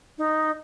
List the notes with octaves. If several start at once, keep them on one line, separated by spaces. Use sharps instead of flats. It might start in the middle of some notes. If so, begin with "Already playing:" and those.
D#4